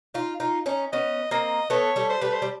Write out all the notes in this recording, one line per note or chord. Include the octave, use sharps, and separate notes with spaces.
D#4 F4
D#4 F4
C#4 D#4
B3 C#4 D#5
A#3 C4 D#5
A3 B3 C#5
G3 A3
C5
G3 A3 B4
C5
G3